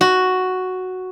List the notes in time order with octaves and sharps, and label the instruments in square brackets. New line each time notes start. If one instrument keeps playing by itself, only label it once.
[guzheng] F#4